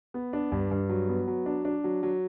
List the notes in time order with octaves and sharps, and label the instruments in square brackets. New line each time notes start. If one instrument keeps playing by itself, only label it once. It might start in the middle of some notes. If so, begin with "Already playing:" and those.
[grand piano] B3
D4
G2
G2
F#3
B3
F#3
D4
D4
F#3
F#3